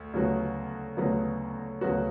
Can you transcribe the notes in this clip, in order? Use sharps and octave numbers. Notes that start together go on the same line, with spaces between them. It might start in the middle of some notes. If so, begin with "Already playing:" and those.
Already playing: D2
D2 C#3 F#3 B3 F#4
D2 C#3 F#3 B3 F#4
D2 C#3 F#3 B3 F#4